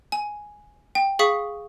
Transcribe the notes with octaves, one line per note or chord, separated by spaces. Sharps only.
G#5
G5
G#4 F5 C#6 D#6 B6